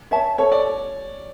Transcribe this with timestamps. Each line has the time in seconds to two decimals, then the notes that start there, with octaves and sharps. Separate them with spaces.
0.11 C#5 E5 A5
0.38 A4 C#5
0.52 D5